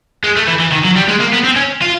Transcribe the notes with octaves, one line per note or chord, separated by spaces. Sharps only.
G#3
A3
E3
E3
D#3
F#3
G3
G#3
A#3
B3
C4
C#4
F4